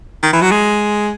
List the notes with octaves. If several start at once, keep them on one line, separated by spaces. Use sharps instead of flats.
D#3
E3
F#3
G#3